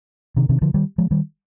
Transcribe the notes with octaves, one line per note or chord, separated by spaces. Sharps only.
C3 D#3
C3 D#3
D3 F3
D#3 G3
F3 G#3
D#3 G3